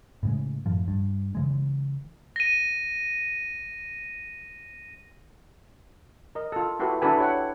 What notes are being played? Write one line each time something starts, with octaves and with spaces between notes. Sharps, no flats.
A2 C#3 G#3
F#2 A2 F3
G2
C#3 E3 G#3
A#6 D#7
A#4 D#5
F4 A4
E4 F#4 G4 A4 B4
D4 E4 F#4 A4 B4 G#5
G4 C#5 F#5